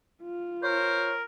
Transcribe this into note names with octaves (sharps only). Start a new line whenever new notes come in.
F4
A#4 C5 C#5